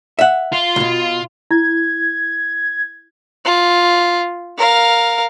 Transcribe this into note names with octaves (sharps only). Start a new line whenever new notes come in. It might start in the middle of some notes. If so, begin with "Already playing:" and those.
E5 F#5
F4
C2 B2
E4 G#6
F4
A#4 F5